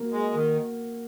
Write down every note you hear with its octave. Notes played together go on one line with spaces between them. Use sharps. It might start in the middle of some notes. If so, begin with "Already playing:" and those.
Already playing: A#3 F#4
G#3
D#3